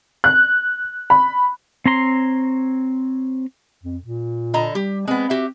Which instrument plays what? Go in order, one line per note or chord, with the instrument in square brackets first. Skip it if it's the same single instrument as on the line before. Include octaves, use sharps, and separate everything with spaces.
[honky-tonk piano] F#6
B5
[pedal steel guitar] C4 C#5 A#5 C6
[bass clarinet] F2
A#2
[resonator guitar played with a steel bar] D3 D#5 A#5
[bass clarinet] G3 [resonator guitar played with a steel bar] G4
[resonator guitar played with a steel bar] G#3 B3 [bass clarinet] C4
[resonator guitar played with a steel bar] F#4 G4 E5